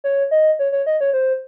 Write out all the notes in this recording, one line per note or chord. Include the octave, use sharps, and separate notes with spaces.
C#5
D#5
C#5
C#5
D#5
C#5
C5